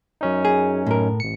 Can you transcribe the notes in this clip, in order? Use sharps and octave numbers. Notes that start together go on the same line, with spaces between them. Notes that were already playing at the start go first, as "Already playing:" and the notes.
F#2 C#4 D#4
G#4
A2 A#4
A1 C#7